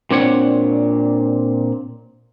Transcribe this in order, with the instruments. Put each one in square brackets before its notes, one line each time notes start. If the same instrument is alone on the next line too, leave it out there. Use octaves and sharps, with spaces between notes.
[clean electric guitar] A#2 C4 D4 C#5 F#5